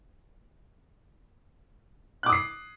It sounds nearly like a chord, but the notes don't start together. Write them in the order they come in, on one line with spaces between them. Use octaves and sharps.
F#6 D6 D#6 C7